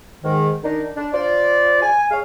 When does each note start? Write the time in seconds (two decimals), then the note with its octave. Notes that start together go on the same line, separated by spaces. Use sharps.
0.24 G#2 D#3
0.64 D#3 D4 D#4
0.96 D4
1.14 F4 C5 D5
1.82 G#5
2.11 G#4 C#5 F5